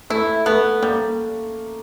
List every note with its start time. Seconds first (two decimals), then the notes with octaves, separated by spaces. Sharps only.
0.10 A3 E4
0.46 A3 B3
0.82 G3 A#3